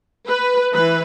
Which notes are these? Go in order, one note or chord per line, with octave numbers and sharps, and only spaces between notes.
B4
E3 B4